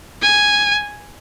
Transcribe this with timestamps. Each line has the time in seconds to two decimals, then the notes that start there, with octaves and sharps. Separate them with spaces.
0.22 G#5